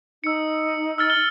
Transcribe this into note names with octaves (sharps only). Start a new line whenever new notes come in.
D#4 E6 C#7
E6 F6 A6
F6 G7